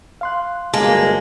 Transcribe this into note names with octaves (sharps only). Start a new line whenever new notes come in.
F5 C6 F#6
G1 F#3 G#3 A#3 F5 G#5 A5